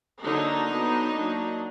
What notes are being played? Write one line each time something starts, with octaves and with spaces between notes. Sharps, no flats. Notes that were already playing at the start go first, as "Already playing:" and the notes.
D3 F#3 A#3 D4 D#4
F#3 B3 D4
F#3 A#3 D4